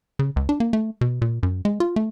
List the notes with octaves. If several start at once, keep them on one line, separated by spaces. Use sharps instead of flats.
C#3
C#2
D4
A#3
A3
B2
A#2
F#2
G#3
F4
A3